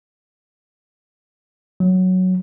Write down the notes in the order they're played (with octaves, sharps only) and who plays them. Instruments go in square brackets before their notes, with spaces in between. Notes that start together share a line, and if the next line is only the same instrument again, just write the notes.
[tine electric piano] F#3